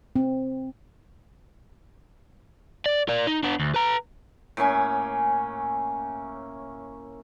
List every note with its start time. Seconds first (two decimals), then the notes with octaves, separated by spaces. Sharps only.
0.16 C4
2.86 D5
3.09 A#4 D5
3.27 D#4
3.43 B3 D4
3.60 D2
3.74 B4 A#5
4.57 A2 A#3 C#4 G#5